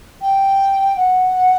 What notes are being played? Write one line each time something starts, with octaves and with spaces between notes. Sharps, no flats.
G5
F#5